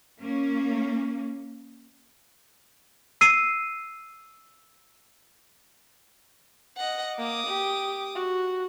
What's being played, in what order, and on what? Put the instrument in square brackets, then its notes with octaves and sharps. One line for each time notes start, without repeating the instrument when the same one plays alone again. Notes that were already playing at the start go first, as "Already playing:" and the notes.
[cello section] A#3 C#4
[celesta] E6 C7 D#7
[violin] D#5 F#5
[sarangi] A#3 [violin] D6 D#6
[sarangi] G4
F#4